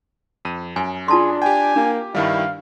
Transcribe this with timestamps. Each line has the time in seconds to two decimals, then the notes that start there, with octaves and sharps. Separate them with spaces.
0.45 F2 D#7
0.76 F#2 G#5
1.08 D4 F4 G#4 A5 C6
1.42 G4 G5 G#5
1.76 A#3 D4
2.15 G2 D#3 G3 E4 F5